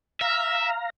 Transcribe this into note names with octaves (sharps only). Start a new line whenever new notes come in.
E5 F5 A#5